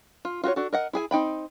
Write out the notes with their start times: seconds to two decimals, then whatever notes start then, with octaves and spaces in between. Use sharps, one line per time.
0.25 F4
0.44 F4 F#4 G#4 C#5
0.56 D4 F#4 A4
0.73 A#4 D#5 F#5
0.93 E4 G#4 G#5
1.11 C4 D#4 G5 B5